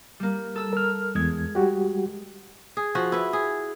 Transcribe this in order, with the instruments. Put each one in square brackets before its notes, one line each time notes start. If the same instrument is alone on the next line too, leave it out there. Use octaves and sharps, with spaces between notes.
[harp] G3 A#3
A4 E6
[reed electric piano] A#4 F6
[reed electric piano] E2 G#6 [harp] G#3
[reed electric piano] G3 F#4 G4
[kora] G#4
F3 F#4
E4 B4
G#4